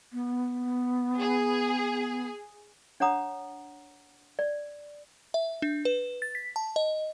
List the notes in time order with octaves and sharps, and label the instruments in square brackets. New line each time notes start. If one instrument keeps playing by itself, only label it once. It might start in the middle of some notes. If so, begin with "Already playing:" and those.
[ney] B3
[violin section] G#4
[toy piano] D4 C#5 F#5 A#5 D#6
D5
[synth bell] E5
D4
B4
A6
B6
A5
D#5